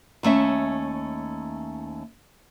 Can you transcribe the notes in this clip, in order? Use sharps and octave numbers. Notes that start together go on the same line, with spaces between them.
D#2 A3 C#4 E5